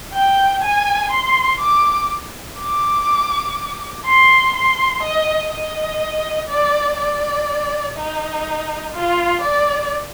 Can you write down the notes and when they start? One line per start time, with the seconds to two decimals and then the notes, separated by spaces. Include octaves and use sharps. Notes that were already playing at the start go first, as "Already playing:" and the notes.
0.14 G5
0.63 G#5
1.11 C6
1.60 D6
2.58 D6
4.05 C6
4.54 C6
5.03 D#5
5.52 D#5
6.48 D5
6.98 D5
7.96 D#4
8.93 F4
9.42 D5